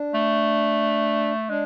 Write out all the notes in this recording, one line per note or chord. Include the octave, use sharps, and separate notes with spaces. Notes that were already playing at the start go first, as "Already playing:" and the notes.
Already playing: D4
A3
G#3 D4